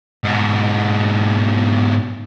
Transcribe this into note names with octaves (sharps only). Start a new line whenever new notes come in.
G#2 B2